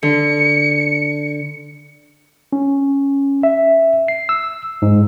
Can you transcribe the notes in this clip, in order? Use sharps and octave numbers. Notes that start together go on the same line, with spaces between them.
D3 C#7
C#4
E5
C7
E6
G#2